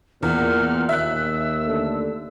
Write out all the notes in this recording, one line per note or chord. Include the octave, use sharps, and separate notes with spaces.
E2 A#2 B3 F6
D#2 E5 E6 F#6
D3 A3